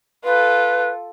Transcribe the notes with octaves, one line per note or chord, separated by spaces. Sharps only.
F4 A4 B4